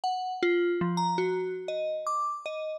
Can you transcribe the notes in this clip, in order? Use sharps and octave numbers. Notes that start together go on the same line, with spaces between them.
F#5
F4
F3
A#5
F#4
D#5
D6
D#5